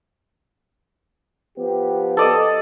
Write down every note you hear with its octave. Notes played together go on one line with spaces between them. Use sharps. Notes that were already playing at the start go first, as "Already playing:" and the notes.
F3 B3 G4
A4 D5 D#5